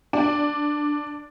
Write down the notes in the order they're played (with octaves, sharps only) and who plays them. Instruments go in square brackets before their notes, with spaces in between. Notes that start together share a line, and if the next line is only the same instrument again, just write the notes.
[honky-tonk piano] D4